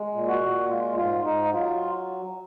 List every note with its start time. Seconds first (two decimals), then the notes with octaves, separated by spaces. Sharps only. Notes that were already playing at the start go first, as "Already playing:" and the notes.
Already playing: G#3
0.14 A#2
0.28 F#4
0.42 A#2
0.69 G#3 F4
0.97 G#2 F4
1.25 G#2 D#4
1.53 F#3 F4